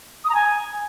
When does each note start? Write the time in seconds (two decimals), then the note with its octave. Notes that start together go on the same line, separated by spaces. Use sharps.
0.24 D#6
0.29 A#5
0.34 G#5